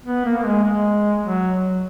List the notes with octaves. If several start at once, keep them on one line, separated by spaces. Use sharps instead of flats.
B3
A#3
A#3
G#3
G#3
F#3